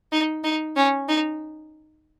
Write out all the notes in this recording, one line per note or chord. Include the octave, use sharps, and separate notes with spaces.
D#4
D#4
C#4
D#4